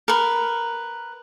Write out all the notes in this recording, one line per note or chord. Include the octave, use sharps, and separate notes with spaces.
A#4 B4